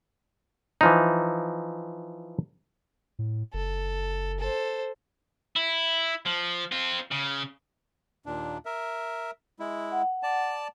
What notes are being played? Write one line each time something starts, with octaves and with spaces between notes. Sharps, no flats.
E3 F3 D#4
A2
F#1 A4
A4 C5
E4
F3
C4 F4
C#3
D#2 A#2 D4
A#4 E5
G#3 E4
F#5
D5 A5